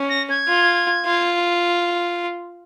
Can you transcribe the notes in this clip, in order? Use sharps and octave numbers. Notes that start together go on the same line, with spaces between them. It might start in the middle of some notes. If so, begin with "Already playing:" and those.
Already playing: C#4
A#6
G#6
F4
F4